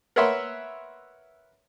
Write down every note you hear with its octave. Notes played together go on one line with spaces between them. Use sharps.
A#4 B4 C#5 E5 F#5 C6